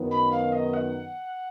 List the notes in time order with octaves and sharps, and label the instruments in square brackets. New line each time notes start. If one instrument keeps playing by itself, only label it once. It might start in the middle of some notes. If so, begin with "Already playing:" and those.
Already playing: [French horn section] F#2 D#3 F#3 B3 D#4
[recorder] B5
F5
D#5
F#5